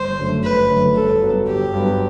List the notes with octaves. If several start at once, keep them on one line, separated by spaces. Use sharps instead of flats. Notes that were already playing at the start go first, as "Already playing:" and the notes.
Already playing: G1 C5
F#2 D3 A3
G1 B4
F#2 D3 A3
G1 A4
G2 F#3 B3
G1 G4
G2 F#3 B3